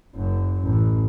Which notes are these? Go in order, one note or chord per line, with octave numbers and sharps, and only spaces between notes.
F#1 F#2
A1